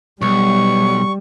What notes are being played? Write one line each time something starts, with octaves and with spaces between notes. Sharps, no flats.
B1 G3 C#6